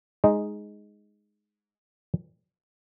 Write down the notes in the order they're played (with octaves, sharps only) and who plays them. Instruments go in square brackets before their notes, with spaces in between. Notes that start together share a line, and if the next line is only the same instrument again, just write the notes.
[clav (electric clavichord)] G#3 D#4 D#5